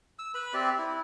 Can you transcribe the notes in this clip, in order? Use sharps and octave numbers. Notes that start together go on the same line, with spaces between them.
E6
B4 B5
C4 G4 D5 E5
E4